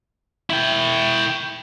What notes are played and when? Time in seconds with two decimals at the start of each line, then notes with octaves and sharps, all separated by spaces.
0.50 E4 G5